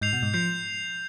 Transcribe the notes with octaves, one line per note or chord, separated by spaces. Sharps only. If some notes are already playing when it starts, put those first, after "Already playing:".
G#2 G6 C7 F7
B2
G#2
F3 G6 C7 F7